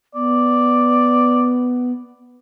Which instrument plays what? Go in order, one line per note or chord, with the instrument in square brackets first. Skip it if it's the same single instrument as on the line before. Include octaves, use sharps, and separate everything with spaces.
[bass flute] B3 [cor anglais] D5